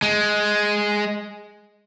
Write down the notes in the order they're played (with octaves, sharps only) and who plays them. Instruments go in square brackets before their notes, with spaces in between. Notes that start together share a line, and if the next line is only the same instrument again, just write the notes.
[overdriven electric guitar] G#3